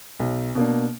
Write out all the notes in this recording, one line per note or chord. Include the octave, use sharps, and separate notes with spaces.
B1
B2 A#3 D4